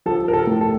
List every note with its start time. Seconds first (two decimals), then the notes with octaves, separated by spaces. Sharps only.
0.06 F3 A4
0.28 A#4
0.33 A4
0.47 A2
0.61 A4